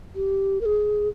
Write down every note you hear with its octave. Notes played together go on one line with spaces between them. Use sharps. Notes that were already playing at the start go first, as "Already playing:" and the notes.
G4
A#4
G#4